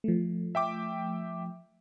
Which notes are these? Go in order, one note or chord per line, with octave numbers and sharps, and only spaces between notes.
F3 A3
E5 G5 D6